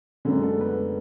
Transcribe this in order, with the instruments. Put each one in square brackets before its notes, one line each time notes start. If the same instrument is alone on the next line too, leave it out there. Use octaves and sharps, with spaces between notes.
[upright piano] F#1 F#2 D3 [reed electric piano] G#3 G#4
[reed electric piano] A3 A4
B3 B4